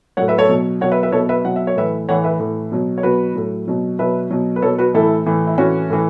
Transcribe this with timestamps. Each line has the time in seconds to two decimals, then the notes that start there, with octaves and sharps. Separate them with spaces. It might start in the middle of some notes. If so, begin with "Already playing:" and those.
0.17 A2 F#3 C#5 F#5
0.28 B4 E5
0.38 A4 C#5
0.49 B2 F#3
0.81 B2 F#3 C#5 F#5
0.92 B4 E5
1.03 B4 E5
1.12 B2 F#3 A4 C#5
1.29 B4 E5
1.45 B2 F#3 F#5
1.56 E5
1.67 C#5
1.76 A2 E3 B4 E5
2.09 A2 E3 C#5 F#5
2.24 B4 E5
2.39 A2 E3
2.72 B2 F#3
2.98 C#5
3.03 B2 F#3 F#4 B4
3.35 A2 F#3
3.68 B2 F#3
3.99 B2 F#3 B4 E5
4.31 B2 F#3
4.56 B4
4.62 B2 F#3 A4 C#5
4.78 F#4 B4
4.94 A2 E3 E4 A4
5.26 A2 E3
5.47 E4
5.57 A2 E3 C#4 F#4
5.90 A2 E3